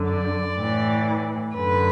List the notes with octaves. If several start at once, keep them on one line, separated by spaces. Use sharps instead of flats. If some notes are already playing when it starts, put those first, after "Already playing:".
Already playing: F#2 D3
D5
A2 E3
F#2 D3 B4